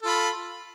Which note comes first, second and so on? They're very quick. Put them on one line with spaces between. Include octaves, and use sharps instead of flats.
A4 F4 B5